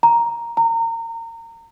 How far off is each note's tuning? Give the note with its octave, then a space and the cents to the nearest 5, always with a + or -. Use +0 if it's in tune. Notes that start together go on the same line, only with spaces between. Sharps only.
A#5 +5
A#5 -30